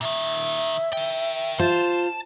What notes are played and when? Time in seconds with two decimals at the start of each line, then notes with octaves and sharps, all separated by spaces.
0.01 A#2 D#3 E5
0.93 A#4 G5
1.60 F4 C5 A5